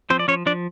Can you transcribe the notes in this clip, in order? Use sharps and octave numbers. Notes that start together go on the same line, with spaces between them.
F3 C4 C5
D5
F3 C#4 C#5
F3 D4 D5